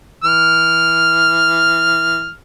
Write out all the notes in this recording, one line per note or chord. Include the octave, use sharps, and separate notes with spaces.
E3 F6